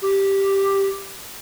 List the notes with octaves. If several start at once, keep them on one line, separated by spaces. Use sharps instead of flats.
G4